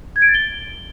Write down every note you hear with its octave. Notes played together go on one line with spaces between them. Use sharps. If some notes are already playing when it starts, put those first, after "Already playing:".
G#6
D7
A6
G7